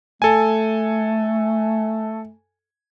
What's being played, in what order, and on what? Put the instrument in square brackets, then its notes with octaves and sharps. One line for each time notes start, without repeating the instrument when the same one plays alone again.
[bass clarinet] A3 [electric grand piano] A4 G#5